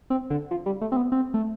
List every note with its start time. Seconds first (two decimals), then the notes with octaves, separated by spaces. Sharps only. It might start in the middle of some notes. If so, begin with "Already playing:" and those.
0.10 C4
0.30 D3
0.51 F3
0.66 G3
0.81 A3
0.92 C4
0.97 B3
1.12 C4
1.34 A3